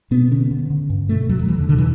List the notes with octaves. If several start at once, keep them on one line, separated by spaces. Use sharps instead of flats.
B2 B3
D3 C#4
D3
D3
G2
B2 A3
E2 F#3
F#3
E2 E3
D3
B2 D3
E3